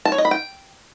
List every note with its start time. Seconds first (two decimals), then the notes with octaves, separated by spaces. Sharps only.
0.05 A5
0.12 C#5
0.18 D#5
0.25 B5
0.31 G5